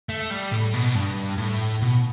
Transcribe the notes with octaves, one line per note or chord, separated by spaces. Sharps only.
A3
G3
A2
B2
G2
A2
B2